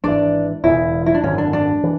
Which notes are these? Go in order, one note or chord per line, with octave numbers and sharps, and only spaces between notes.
G#1 G#2 E3 D4 D5
E1 E2 C#3 E4
E4
D4
G#1 F#2 D3 C#4
D4
D4
E3